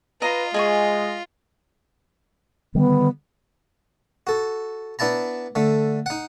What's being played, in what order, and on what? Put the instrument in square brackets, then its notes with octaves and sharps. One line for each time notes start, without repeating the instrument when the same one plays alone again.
[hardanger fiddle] F4 [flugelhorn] B4 [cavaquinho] D#5 A#5
[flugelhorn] G#3 [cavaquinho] G#4 G#5 C#6 [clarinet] D#5
[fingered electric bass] D3 D#3 G3 [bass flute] B3
[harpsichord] F#4 A4
B3 D4 E4 A5 A#5
D3 A3
D#4 F#5